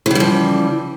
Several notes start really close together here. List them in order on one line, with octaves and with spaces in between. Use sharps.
E3 C#3 G3 F3